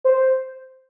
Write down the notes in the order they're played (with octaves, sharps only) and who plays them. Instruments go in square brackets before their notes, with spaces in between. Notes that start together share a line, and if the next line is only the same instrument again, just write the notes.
[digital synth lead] C5